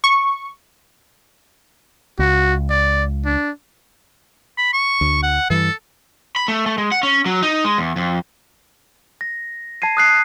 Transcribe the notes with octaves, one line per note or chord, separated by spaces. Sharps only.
C#6
C#2 F#4
D5
D4
B5
C#6
D2
F#5
G2 E3 A4
B5
A3
A3
G#3
F#5
C#4
F#3
D#4
G#3
E2
F2
A#6
A5 G#6 C7 D#7
D#6 F#6 C7